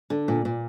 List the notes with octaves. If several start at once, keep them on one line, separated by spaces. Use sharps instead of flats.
D3
A#2
A#2